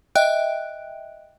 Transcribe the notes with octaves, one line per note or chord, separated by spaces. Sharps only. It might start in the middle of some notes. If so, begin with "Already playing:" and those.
D#5 E5 G5 F#6 D7